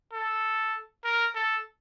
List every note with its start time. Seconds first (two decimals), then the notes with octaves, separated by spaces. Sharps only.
0.12 A4
1.04 A#4
1.35 A4